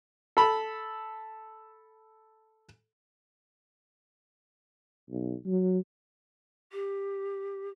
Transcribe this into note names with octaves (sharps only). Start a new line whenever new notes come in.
A4 B5
B1
F#3
G4